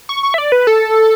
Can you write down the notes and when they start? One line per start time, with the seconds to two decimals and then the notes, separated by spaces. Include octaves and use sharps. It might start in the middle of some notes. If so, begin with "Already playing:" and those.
0.09 C#6
0.23 C#6
0.34 E5
0.38 D5
0.52 B4
0.67 A4